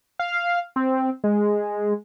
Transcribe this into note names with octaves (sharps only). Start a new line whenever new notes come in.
F5
C4
G#3